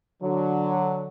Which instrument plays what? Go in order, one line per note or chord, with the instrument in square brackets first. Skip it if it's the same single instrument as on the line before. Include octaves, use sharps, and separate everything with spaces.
[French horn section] D3 F#3